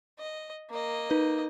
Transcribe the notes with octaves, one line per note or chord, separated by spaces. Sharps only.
D#5
A#3 D#5
D#4 B4